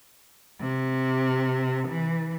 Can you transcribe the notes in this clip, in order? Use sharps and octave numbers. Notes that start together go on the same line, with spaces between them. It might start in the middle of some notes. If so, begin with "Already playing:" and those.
C3
E3